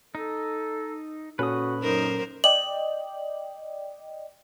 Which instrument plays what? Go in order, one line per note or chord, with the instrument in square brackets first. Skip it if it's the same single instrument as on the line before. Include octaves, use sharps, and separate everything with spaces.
[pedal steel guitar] D#4 [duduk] A4
[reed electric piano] A#2 C#4 A4 [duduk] F#4 [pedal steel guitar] B4 D#6
[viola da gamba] F#2 A#4 C5 [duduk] D#4
[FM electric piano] D5 D#5 G5 [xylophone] F#7